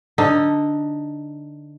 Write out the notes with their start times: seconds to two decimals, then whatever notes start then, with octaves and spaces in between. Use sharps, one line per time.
0.18 D3 D#4